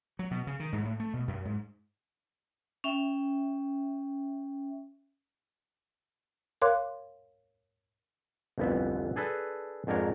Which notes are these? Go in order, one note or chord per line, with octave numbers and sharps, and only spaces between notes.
F#3
B2
C#3
D#3
G#2
A2
A3
B2
F#2
G#2
C#4 E5 G5
A#4 C#5 F5 C6 D6 F#6
G1 C2 F2 E3 B3 E5
D4 G#4 A4 B4
F2 G#2 D4 A#4 C#5